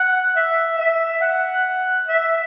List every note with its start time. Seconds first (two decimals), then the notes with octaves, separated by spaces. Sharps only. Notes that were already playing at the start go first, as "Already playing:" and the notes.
Already playing: F#5
0.36 E5
0.79 E5
1.21 F#5
2.07 E5